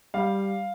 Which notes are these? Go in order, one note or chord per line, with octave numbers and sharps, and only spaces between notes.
G3 F5